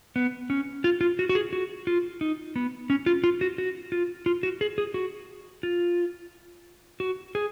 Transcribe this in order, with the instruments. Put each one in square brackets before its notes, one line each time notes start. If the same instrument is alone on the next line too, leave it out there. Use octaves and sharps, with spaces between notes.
[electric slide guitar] B3
C#4
F4
F4
F#4
F#4
G#4
F#4
F4
D#4
B3
C#4
F4
F4
F#4
F#4
F4
F4
F#4
G#4
G#4
F#4
F4
F#4
G#4